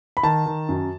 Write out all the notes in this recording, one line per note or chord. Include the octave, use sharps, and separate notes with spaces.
B5
D#3 A5
D#3
F#2